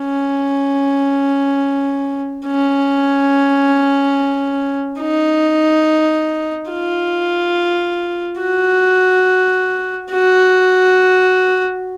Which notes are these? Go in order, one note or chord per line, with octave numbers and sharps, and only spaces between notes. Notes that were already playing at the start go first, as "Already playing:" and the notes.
Already playing: C#4
C#4
D#4
F4
F#4
F#4